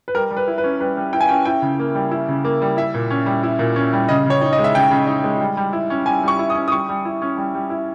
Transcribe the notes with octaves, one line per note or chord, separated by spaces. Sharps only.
B4
G3 A#4
G3
B4
E4
B4
C#4
G3 B4
G3
E4 G5
G#5
C#4 G5
E4 G5
C#3
A#3
G3
E4
C#3
A#3
G3
E4 E5
A#2
C#4
G3
E4
A#2
C#4
G3
C#3 D#5
C#3 C#5
D#4
D#5
G#3
E5
C#3 G5
C#3
D#4
G#3
G3
G3
E4
C#4
G3 G#5
G3 C#6
E4
D#6
C#4
D#6
G3 C#6
G3
E4
C#4
G3
G3
E4